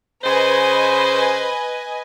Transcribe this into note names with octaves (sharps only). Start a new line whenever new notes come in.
C#3 B4 C5 D#5 G#5